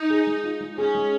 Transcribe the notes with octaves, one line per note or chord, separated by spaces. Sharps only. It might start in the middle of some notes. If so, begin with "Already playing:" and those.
Already playing: D#4
G#4
G#3
F4
G#3
C#4 G#4
G#3